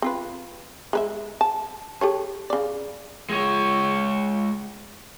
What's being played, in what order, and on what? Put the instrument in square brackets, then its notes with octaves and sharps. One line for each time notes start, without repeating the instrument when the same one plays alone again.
[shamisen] C4 F4 B4
G#3 B4 E5
A5
G4 A4 C#5
C#3 D5
[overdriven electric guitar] G#3 C#5